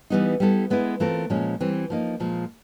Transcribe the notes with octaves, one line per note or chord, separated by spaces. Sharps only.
E3 G3 B3 D#4
G3 B3 E4 A4
G#3 B3 E4
E3 A3 C4 F4 A#4
A#2 F3 G#3 C#4
E3 G3 C4
F3 A#3 D#4
A#2 F3 G#3